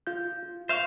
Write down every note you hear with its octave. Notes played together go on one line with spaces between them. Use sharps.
F4 G6
F4
C5 E5 F5 C#6